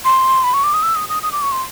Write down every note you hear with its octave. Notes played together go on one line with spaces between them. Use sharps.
C6
B5
C#6
D6
D#6
E6
D#6
D#6
D#6
D6
C#6
C6